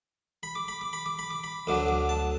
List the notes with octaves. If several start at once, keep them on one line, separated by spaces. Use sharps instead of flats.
B5
D6
B5
D6
B5
D6
B5
D6
B5
D2 D3 F#3 D6
D6
A5